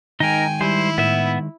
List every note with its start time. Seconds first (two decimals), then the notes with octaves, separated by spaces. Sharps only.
0.20 D#3 G#3 D#4 A#4 G5 G#5
0.61 G3 E4 C5
0.98 A2 B3 E5